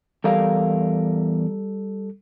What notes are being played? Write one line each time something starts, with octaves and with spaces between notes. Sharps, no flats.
E2 G3 A4 A#4 F5